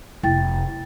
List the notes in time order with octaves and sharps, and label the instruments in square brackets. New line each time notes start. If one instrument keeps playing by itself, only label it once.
[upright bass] F1 [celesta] E4 G5 A6